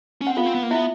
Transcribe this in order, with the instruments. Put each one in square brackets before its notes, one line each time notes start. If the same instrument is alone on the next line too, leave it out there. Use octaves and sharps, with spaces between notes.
[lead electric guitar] C#4
[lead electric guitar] C4 [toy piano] F#5
[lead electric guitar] B3 [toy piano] F4 F5
[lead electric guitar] C4
B3
A#3
[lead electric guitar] B3 [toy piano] E4 E5